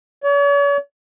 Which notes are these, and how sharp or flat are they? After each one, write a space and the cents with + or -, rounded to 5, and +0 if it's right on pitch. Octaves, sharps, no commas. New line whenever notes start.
C#5 +45